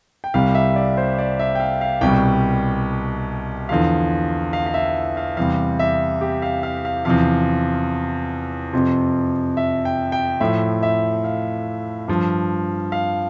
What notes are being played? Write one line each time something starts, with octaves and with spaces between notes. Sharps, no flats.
G5
C2 C3 G3 F5
E5
D5
C5
D5
E5
G5
F5
F5
C2 B2 G3 G5
E2 D3 F3 F5
F5
F5
E5
F5
E2 C3 G3 F5
E5
G4
F5
F5
F5
E2 C3 F3 F5
F2 C3 F3
E5
G5
G5
A2 F3 E5
E5
F5
G2 F3
F5